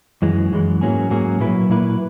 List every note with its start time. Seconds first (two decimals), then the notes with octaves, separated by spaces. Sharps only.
0.22 F#2 E3 G#3
0.52 F#2 E3 G#3
0.81 G#2 F#3 A#3 C#4 G#4
1.10 G#2 F#3 A#3 C#4 G#4
1.39 A#2 F#3 A#3 E4 B4
1.69 A#2 F#3 A#3 E4 B4